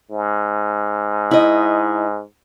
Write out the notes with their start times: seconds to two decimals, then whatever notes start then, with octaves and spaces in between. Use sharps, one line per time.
0.11 G#2
1.31 E4 D#5